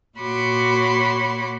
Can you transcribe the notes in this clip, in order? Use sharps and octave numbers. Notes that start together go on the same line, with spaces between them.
A#2 F#4 C#5 B5 C6 D6